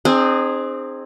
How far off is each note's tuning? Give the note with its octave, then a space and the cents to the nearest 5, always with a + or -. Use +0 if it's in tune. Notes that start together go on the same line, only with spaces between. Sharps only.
C4 +10 D#4 -40 G#4 +0